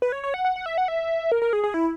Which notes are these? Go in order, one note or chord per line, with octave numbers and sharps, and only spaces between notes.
B4
C#5
C#5
F#5
F#5
F#5
E5
F#5
E5
A#4
A#4
G#4
G#4
E4